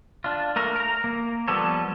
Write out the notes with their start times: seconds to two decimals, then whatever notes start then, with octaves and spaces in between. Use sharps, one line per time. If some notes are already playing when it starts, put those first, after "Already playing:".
0.24 D4 F4
0.56 A3 A#3 A#4
0.76 A#4 A#5
1.04 A#3
1.48 F3 G3 B3 A4 C#5